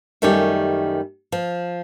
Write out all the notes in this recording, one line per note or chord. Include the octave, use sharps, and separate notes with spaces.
F#2 D#3 G3 A3 C#4 G4
F3